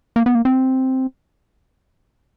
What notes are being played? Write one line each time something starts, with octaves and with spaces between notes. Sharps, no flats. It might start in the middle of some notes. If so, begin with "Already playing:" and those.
A#3
B3
A#3
C4